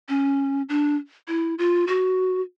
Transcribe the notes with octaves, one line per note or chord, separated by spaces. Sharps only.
C#4
D4
E4
F4
F#4